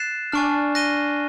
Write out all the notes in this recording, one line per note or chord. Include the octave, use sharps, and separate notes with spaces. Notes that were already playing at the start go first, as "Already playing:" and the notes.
Already playing: F#6 A6 C7 E7
D4 G#5 C#6 F6
F#6 A#6 D#7 G7